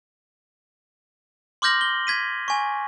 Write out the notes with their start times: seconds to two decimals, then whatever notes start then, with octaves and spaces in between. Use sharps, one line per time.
1.62 C6 D6 F6 G6 A#6 F#7
1.81 G7
2.07 G#6 B6 D#7
2.48 G#5 C#6